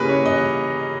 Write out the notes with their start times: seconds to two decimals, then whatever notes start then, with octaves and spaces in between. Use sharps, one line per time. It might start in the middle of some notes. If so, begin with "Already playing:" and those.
Already playing: C#3 G3 A#3 C#4 E4 G#4 A#4 B4
0.09 C#5
0.26 D#5